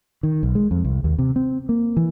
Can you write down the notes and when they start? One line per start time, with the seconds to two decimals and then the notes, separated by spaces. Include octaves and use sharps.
0.23 D#3
0.43 B1
0.55 G#3
0.71 F2
0.84 C2
1.04 D#2
1.19 C3
1.36 C4
1.69 A#3
1.97 E3